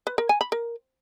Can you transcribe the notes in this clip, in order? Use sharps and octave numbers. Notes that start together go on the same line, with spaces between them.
B4
A#4
G#5
B5
A#4